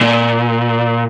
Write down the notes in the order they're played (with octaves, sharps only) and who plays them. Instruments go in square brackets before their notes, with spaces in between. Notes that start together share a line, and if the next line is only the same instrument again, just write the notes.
[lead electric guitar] A#2